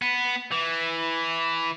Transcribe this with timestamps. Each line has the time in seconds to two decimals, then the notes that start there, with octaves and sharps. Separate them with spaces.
0.02 B3
0.52 E3